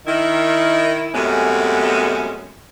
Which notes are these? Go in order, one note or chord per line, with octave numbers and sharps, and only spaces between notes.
D#3 E4
F#2 C3 G#3 A3 B3 C#4